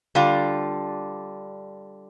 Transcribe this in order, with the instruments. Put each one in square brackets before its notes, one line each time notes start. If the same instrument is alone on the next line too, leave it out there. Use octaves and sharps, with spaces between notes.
[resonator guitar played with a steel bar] D3 G3 D4 F4